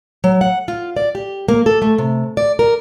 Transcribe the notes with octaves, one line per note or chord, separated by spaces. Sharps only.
F#3
F#5
F4
D5
G4
A#3
A4
A3
C3
D5
A#4